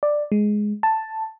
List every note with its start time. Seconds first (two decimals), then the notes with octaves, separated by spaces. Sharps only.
0.03 D5
0.32 G#3
0.83 A5